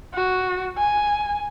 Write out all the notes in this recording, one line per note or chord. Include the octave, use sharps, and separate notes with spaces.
F#4
G#5